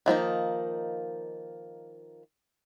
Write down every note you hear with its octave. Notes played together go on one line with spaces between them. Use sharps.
D#3 F3 A#3 D#4